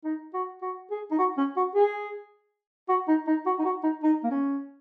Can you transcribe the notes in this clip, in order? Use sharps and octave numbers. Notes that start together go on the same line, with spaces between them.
D#4
F#4
F#4
G#4
D#4
F#4
C#4
F#4
G#4
F#4
D#4
D#4
F#4
D#4
F#4
D#4
D#4
A#3
C#4